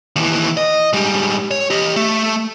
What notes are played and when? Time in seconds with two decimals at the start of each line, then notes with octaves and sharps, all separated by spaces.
0.16 D#2 E3
0.57 D#5
0.93 G#2 G3
1.51 C#5
1.70 G4 D#5
1.96 A3